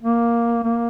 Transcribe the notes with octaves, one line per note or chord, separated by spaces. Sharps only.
A#3
A#3